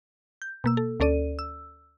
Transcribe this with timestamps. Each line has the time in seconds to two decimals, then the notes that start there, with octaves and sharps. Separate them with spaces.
0.42 G6
0.64 B2 A#3 E6
0.77 A4
1.00 D2 C#4 A4 D5 D#7
1.39 E6